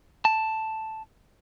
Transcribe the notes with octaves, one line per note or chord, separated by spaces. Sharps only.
A5